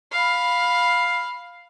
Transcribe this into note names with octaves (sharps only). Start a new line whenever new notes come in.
F5 B5